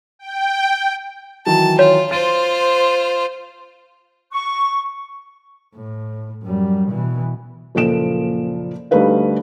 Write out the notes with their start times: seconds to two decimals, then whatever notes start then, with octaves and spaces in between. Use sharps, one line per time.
0.19 G5
1.46 D#3 E3 F#3 A5
1.79 F4 C#5
2.11 F4 C5 A6 D7 D#7
4.31 C#6
5.75 A2
6.43 F#2 G3
6.90 B2 E3
7.75 F#1 A#2 F3 A4 D7 E7
8.91 D2 G3 A3 D#4 B4 F5